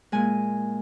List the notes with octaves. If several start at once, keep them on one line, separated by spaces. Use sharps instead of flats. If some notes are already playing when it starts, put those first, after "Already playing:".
A#2 G#3 G#5